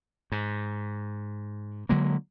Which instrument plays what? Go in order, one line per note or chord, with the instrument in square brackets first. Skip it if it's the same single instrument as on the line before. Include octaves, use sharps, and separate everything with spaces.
[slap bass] G#2
D3 F#3 G#3 A#3